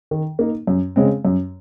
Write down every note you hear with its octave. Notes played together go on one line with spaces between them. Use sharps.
D#3
A#3 D#4
F#2
C#3 G#3 C4
F#2